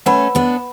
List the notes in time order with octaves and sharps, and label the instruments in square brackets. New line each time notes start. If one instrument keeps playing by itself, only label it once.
[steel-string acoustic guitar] A3 C#4 [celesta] B4 F#5 B5
[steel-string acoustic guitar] B3 D4